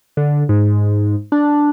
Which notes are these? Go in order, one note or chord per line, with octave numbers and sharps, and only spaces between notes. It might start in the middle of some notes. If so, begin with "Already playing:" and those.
D3
G#2
D4